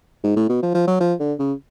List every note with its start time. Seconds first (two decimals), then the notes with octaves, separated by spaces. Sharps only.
0.24 G#2
0.36 A2
0.49 B2
0.63 F3
0.75 F3
0.87 F#3
1.00 F3
1.20 D3
1.39 C#3